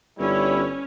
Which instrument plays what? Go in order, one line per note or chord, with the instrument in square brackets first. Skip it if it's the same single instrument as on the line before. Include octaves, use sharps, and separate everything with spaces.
[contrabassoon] G1 [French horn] G3 [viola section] C#4 C#5 [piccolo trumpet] E4